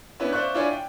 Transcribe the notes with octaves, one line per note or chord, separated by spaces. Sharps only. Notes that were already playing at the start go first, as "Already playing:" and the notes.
B3 C#4 D4 E4 B4
C5 D5 E5 F5 C#6 F#6
D4 E4 F4 C#5 D5 G#5
G5